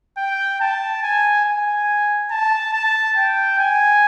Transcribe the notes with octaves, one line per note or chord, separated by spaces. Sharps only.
G5
A5
G#5
G#5
A5
A5
G5
G#5